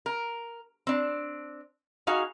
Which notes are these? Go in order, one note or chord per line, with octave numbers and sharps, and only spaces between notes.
A#4
C4 D4
D#4 F#4 G#4 F5